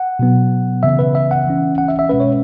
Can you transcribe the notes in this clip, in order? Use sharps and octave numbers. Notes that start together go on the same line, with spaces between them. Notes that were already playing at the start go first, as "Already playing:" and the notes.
Already playing: F#5
B2 F#3 B3
C#3 E3 B3 E5
B4
E5
F#5
E3 C#4
F#5
E5
E5
B2 G#3 C#4 B4
C#5